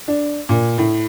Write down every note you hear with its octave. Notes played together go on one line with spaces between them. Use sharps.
D4
A#2
A2